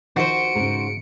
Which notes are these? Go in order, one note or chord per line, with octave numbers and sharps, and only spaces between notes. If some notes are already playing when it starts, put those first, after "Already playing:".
D#3 F3 F#4 C5 C#7 D7
G#2 C#3